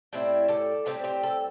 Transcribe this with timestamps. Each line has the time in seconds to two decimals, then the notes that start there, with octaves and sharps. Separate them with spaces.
0.13 A2 G3 C4 E4
0.48 A4 D5
0.86 A2 G3 C4 G4 C5
1.04 G4 C5
1.23 A4